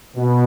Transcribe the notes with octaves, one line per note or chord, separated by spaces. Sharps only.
B2